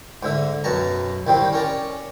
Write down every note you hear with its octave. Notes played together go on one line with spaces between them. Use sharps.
G#2 D3 E5
B1 F#2 B4 A5 A#5
C2 D#3 G3 C4 G5
C#4 A#4 D5